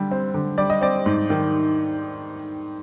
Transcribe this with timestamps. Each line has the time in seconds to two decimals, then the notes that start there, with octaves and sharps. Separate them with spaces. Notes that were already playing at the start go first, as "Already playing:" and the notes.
Already playing: D3 G3
0.11 C4
0.34 D3
0.58 G3 D5
0.70 D#5
0.81 C4 D5
1.06 G#2
1.30 D#3